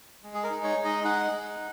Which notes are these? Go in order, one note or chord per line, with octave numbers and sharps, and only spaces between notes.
G#3
G#4
A#4
D#4
C#5
G#3
D#5
D#4 F#5
G#3